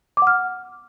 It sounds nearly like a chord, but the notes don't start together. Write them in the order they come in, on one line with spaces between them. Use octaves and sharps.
D6 F#5 F6